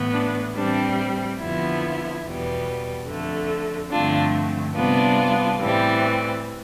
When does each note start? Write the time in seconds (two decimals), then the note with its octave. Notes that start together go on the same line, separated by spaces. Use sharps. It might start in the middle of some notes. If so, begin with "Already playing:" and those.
Already playing: A2 E3 B3
0.13 D4
0.55 A2 E3 G3 C4 D4
1.39 F2 D3 F3 B3 E4
2.23 E2 B2 G3 B3
3.07 F2 D3 A3
3.91 G2 D3 F3 A3 C4 D4 F4
4.75 C3 G3 B3 D4 F4
5.60 A2 E3 G3 C4